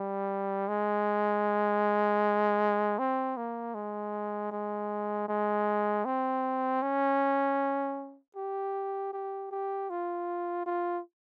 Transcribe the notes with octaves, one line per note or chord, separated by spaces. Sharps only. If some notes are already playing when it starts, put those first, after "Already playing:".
Already playing: G3
G#3
C4
A#3
G#3
G#3
G#3
C4
C#4
G4
G4
G4
F4
F4